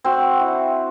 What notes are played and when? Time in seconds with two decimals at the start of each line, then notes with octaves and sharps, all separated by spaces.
0.04 C4 F#4
0.40 E4